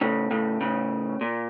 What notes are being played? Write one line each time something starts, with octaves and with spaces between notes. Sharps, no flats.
A2 C#3
A2 C#3
A2 C#3
A#2